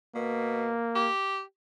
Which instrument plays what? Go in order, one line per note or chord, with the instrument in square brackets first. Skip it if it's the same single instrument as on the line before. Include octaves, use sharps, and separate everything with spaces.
[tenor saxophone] B2 [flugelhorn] A#3
[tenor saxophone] G4